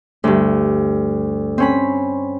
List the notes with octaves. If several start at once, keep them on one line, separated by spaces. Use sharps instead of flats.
D2 G2
C4 C#4 B5